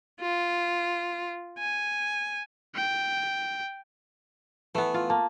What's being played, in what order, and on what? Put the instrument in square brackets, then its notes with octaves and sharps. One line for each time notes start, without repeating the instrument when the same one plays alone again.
[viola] F4
G#5
[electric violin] G5
[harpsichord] E3 [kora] A3 B3
[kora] F4
[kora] A#3 [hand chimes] A5